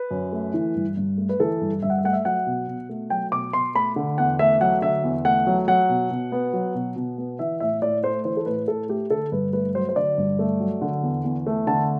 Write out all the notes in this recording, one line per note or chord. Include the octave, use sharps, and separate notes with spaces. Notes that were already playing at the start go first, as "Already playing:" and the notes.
Already playing: B4
F#2
A3
E3
G2
G2
A3
B4
E3 A4
G2
G2 E5
F#5
E5
A3 F#5
E5
F#3 F#5
B2
B2
A3
F#3 G5
B2 D6
B2 C6
A3 B5
D3
E2 F#5
A3 E5
F#3 F#5
D3 E5
E2
A3 F#5
F#3
F#3 F#5
B2
B2
B3
F#3
B2
B2
B3
E3 E5
A2 E5
A2 D5
A3 C5
E3 C5
A4
A2 B4
A2 A4
A3 G4
D3 A4
G2 B4
A3 B4
F#3 C5
C5
D3 D5
G2
A3
F#3
D3
E2
E2
A3
D3 A5